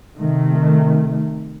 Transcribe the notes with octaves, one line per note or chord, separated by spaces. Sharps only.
C3 D#3 A3